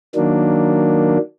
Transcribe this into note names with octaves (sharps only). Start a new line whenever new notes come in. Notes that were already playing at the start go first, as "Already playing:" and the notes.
D#3 F#3 A#3 D4